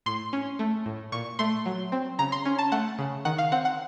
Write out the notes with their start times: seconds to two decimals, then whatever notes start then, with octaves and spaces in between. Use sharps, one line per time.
0.06 A2 C6
0.33 C#4
0.59 A3
0.86 A2
1.12 A#2 C#6
1.39 A3 C6
1.66 F#3
1.92 C4
2.19 C#3 A#5
2.32 C6
2.45 C#4
2.59 A5
2.72 A3 F#5
2.99 C#3
3.25 D#3 F#5
3.38 F5
3.52 C4 F#5
3.65 F#5